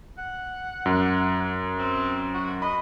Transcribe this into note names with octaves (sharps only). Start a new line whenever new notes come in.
F#5
F#2
C4
F#4
D#5 B5